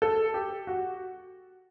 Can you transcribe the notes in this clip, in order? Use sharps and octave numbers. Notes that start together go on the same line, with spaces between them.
A4
G4
F#4